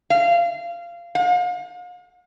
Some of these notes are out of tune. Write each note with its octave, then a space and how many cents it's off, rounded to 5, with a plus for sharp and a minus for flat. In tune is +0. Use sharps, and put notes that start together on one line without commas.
F5 -20
F5 +40